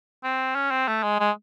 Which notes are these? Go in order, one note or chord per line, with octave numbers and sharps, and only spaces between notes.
C4
C#4
C4
A3
G#3
G#3